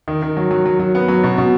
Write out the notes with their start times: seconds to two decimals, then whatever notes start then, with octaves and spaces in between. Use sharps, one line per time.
0.08 D#3
0.22 D#3
0.37 F#3
0.51 F#3
0.66 F#3
0.80 F#3
0.95 B3
1.08 F#3
1.23 B2
1.38 B2